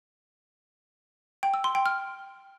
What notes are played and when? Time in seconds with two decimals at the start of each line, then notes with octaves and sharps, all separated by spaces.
1.43 G5
1.54 E6
1.64 C6
1.75 G5
1.86 F6